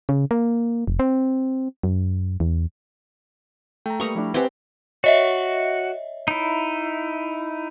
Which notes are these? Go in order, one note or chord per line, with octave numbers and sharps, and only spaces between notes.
C#3
A#3
F1
C4
F#2
E2
A3 G5 A#5
G3 A#3 B4 A#5 C#6 D#6
F3 A3 D4 E4
C4 G4 B4 E5 F#5 G#5
F#4 C#5 D#5 E5
D#4 E4